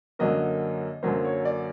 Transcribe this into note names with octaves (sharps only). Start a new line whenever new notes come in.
F#2 D3 F#3 A#3 D#5
F#2 D3 F#3 A#3 C5
C#5
D5